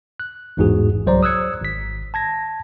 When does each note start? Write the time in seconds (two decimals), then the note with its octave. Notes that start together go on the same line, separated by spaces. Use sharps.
0.20 F#6
0.57 A1 E2 G#2 E3 F#4 G#4
1.06 C2 F#3 C5 D5 A#5
1.23 D#6 E6 F#6 G#6 C#7
1.61 G#1 B6
2.14 A5 G#6 A#6